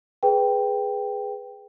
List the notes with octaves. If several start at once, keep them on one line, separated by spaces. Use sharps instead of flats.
G#4 B4 G5